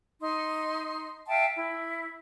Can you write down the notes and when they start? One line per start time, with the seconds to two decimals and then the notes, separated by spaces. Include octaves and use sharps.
0.20 D#4 C6
1.28 E5 F5 G5 A5
1.55 E4